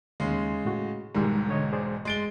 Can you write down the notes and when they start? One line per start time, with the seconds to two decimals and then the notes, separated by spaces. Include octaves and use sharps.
0.20 D#2 C#3 G#3 C6
0.65 A2 F#4
1.15 E1 G#2 D#3 G3 G#3
1.49 D3 C#5 D#5
1.73 G#4 C5 D5
2.05 G#3 C6 A6 D7 G7